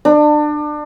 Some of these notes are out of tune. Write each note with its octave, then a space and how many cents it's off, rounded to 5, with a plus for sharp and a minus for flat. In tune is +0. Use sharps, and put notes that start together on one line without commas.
D4 +30